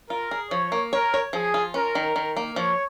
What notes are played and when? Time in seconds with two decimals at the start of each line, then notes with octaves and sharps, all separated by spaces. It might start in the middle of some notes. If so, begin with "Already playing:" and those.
0.10 F4 A#4
0.31 G#4
0.51 F3 C#5
0.72 A#3
0.93 A#4 C#5
1.14 C#5
1.33 F3 G#4
1.54 F4
1.74 C#4 A#4
1.95 D#3
2.16 D#3
2.37 A#3
2.56 F3 C#5